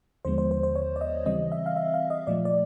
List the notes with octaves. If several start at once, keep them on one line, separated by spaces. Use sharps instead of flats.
D#2 D3 F3 G#3 B3 C5
C5
C5
C5
C#5
D5
D#5
C#3 E3 G3 C4 D#5
E5
F5
E5
F5
D#5
A#2 F3 A3 D5
D5